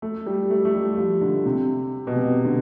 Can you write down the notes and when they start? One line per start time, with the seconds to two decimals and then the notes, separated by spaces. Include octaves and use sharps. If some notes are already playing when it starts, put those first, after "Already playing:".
0.02 A3
0.26 G3
0.50 A3
0.65 A3
0.74 G3
0.98 F3
1.21 D3
1.45 C3
2.07 B2
2.16 C3
2.45 D3